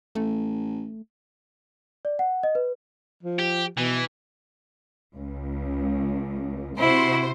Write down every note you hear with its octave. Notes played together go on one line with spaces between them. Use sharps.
A1 A3
D5
F#5
D#5
B4
F3
G4
B2 E3
C#2
C3 E4 F#4 C5